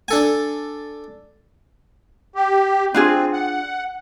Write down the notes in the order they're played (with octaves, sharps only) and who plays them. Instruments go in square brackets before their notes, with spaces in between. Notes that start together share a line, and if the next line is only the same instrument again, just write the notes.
[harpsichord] D4 A4 G#5
[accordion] G4
[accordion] C4 [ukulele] D4 F4 G#4
[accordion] F#5